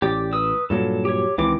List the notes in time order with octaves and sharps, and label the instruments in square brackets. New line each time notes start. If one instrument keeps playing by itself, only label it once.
[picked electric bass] A1 [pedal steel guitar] G4 D5
[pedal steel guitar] B4 D#6 E6
[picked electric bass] G2 A#2 F#3 [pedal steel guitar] A4
[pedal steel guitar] G4 C#5
[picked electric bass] C#2 E3 [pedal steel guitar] D#3 C4 D6